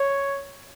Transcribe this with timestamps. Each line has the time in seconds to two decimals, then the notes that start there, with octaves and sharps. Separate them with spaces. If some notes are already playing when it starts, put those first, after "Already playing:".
Already playing: C#5